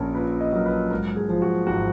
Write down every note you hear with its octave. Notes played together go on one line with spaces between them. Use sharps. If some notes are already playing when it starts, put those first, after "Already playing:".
Already playing: A#1 C#4 A#4
A#2 B4
D#5
F#3 A#4
B4
G#2 A#4
G#4
F3
F#4
G#1 F#4